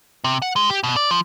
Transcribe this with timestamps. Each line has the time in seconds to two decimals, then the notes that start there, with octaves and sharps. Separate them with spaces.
0.24 C3
0.42 F#5
0.56 G#3
0.70 G4
0.84 B2
0.96 D5
1.11 F3